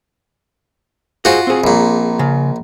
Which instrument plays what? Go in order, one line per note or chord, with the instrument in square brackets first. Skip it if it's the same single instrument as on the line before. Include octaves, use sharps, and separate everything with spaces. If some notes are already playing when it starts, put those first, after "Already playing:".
[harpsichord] F4 F#4 [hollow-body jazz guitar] G#4 C5 D#5
[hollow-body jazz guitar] C4 G#4
[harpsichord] A#1 A#2
[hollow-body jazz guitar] C#3